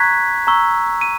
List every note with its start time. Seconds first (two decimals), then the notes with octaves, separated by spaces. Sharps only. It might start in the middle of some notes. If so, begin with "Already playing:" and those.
Already playing: A#5 C#6 F#6 G#6 B6
0.47 A#5 C#6 E6
1.01 D#7